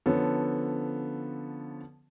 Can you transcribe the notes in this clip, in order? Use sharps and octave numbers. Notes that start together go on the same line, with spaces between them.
D3 F3 B3 C#4 A4